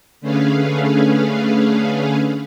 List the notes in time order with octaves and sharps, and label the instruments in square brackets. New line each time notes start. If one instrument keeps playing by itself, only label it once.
[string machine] D3 A3 C#4 G#4 B4 F5